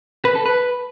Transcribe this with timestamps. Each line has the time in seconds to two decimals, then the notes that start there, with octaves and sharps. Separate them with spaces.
0.25 B4
0.35 A4
0.46 B4